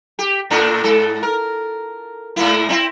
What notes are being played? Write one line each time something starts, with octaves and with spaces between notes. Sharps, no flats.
G4
A2 A3 D4
G#2 A4
A#4
G#2 A#3 E4
C4 C#4 E4